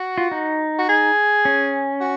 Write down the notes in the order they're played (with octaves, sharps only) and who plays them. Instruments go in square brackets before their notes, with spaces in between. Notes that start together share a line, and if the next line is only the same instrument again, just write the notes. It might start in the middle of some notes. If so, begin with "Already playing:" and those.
Already playing: [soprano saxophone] F#4
[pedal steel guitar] F4
D#4
[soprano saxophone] F#4
G#4
[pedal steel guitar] C#4
[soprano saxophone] F#4